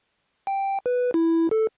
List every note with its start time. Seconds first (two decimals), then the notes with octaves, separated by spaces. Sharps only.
0.47 G5
0.86 B4
1.14 E4
1.51 A4